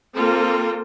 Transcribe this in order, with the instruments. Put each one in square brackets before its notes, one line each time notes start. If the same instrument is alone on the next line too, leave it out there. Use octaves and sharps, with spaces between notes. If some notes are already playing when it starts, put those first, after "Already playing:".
[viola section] A#3 C4 F4 A4